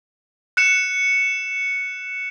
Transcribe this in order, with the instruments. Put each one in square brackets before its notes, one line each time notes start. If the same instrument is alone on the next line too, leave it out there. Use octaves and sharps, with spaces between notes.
[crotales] F#6 C#7 E7